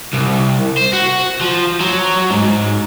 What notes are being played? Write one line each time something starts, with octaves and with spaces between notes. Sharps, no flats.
C2
C5
F#4
F3
F#3
G#2